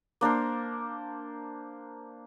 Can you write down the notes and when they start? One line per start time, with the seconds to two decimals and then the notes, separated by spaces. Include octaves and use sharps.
0.21 A#3 D4 A#4 C5